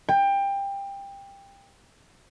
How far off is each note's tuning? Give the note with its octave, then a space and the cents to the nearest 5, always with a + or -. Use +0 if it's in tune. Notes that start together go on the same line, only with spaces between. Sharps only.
G5 +20